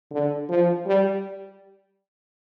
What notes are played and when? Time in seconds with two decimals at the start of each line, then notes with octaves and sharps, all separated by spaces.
0.11 D3
0.49 F3
0.86 G3